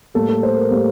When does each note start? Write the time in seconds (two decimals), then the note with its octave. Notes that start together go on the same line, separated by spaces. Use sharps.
0.14 A2 G3 A#3 A4
0.29 A4
0.43 C5
0.57 A#4
0.71 A2 G3 A#3